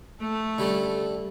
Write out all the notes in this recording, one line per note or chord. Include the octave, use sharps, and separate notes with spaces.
A3 A4
D3 G3 C#4